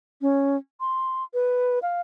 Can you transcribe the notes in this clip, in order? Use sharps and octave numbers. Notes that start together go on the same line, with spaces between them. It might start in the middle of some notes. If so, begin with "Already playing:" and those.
C#4
C6
B4
F5